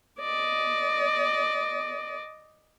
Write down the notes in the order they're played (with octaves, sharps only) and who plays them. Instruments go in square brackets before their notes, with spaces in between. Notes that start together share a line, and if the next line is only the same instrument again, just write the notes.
[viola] D5 D#5